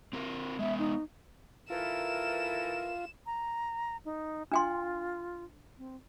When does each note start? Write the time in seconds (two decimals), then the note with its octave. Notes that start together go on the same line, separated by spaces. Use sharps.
0.13 C4 F4 A#4
0.59 G#3 B3 E5
0.78 D#4
1.70 E3 F4 A4 A#4 E7
3.26 A#5
4.05 D#4
4.52 D4 F4 G5 C6
5.78 C4